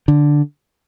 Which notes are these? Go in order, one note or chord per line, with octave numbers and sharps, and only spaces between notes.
D3